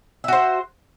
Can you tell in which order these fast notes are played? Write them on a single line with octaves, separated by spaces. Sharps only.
E5 F#4 C5